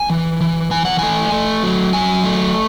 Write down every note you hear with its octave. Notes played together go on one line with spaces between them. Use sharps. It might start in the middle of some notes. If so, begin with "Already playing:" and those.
Already playing: G#5
E3
E3
E3 G#5
F#5
A3 G#5
A3
F#3
F#3 G#5
A3